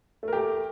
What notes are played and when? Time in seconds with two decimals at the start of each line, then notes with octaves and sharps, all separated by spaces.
0.23 A3
0.28 A#4
0.33 G4